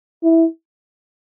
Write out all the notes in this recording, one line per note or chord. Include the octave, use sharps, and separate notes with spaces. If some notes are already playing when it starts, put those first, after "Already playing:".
E4